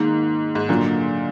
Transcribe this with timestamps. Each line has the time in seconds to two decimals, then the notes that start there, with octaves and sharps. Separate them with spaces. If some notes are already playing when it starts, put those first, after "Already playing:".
Already playing: G#2 D#3 A#3 D#4
0.55 G#2
0.69 A#2 D3 F#3 A#3